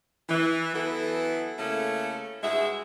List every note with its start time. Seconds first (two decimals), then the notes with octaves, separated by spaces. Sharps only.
0.29 E3
0.74 E3 F#3 B3 E4 A4
1.59 C#3 A3 A#3 C#4 E4 A4
2.43 G2 G#3 F#4 G#4 E5